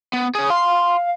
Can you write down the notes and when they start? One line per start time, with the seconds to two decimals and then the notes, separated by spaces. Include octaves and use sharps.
0.13 B3
0.35 G#4 C#5 D#6
0.50 F5 C6